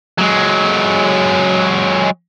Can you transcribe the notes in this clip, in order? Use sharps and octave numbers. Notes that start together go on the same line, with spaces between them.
F#3 G#3